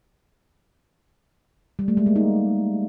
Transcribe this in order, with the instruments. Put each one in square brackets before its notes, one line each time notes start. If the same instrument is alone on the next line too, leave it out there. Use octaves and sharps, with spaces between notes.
[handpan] G3
A3
G#3
A#3
D#4